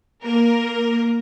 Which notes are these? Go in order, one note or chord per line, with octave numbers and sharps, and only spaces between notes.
A#3 A#4